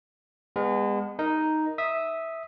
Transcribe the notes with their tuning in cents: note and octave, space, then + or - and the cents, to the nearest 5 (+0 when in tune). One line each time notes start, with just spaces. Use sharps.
G#3 -35 B3 +0 A5 +10
D#4 +0 A#4 +0
E5 -10 D#6 +0